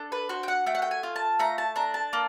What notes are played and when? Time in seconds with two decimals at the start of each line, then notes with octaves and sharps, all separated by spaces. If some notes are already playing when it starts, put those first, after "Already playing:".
Already playing: D4 A4
0.12 B4
0.29 F#4 C5
0.43 G5
0.48 F#5
0.66 A3 G5
0.75 F#5
0.82 G5
0.91 G#5
1.03 F4
1.16 A5
1.39 A3 A#5
1.58 A5
1.76 D4 A#5
1.94 A5
2.13 A#3